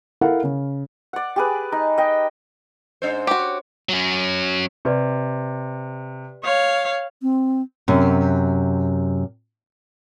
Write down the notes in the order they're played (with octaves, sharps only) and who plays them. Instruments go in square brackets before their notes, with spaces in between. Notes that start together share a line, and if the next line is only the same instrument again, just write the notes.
[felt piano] E4 A4 A#4 F5 F#5
C#3
[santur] D5 F#5
G4 G#4 B4
D#4
D#5 G5
[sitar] G#2 D4 C5
[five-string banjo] F#4 G4
[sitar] C#5
[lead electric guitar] F#3 C#4
[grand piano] C3 [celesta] G4 B4 D5
[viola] C#5 F5
[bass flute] C4
[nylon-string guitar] F#2 C3